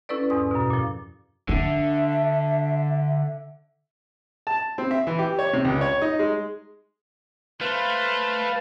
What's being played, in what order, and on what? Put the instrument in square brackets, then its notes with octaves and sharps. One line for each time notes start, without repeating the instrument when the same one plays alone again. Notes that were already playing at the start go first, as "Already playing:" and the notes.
[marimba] C#4 E4 A4 B4 D5
E2 G#2 D#6
F#2 B2
A#2 F3
[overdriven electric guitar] D3 [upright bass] D4 [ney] E5
[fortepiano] A5
C4
E5
E3
G4
C#5
C3
C#2
C#5
D#4
G#3
[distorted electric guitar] A3 [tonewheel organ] B4 F5 [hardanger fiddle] C5